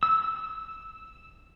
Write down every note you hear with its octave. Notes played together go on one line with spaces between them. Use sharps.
E6